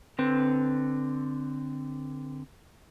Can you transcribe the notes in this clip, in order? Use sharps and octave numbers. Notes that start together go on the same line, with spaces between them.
D3 C4 B4